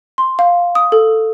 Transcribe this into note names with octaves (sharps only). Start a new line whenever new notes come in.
C6
F5
D#6
A4